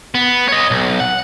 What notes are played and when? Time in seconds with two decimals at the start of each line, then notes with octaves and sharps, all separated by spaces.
0.15 B3
0.49 C#5 D#5
0.71 B1
1.00 F#5